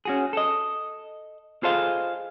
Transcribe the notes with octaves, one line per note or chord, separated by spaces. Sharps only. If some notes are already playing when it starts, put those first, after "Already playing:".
C#4 F#4 G#4
A4 D#5
F4 G#4 A4 C5 D#5 F5